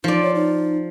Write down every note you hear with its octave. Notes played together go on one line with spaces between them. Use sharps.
F3 D#4 D5
C#5
D#4